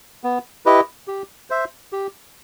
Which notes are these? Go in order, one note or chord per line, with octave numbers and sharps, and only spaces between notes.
B3
E4 G4 B4 D#5
G4
C5 E5
G4